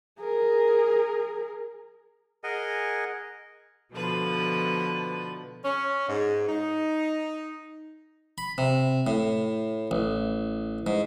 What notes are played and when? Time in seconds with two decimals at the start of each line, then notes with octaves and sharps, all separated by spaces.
0.20 G#4 A#4
2.44 G#4 A#4 D#5 F#5 G#5
3.93 B2 D3 F3 B4
5.64 C#4
6.08 G#2
6.49 D#4
8.38 B5
8.58 C3
9.07 A2
9.91 A1
10.87 G#2